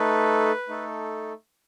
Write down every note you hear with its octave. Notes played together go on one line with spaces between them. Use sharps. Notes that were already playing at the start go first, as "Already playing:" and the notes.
Already playing: A3 D#4 A4 B4
A3 D#4 A4